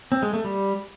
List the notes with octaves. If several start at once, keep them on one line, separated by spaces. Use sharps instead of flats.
C4
G#3
A3
G3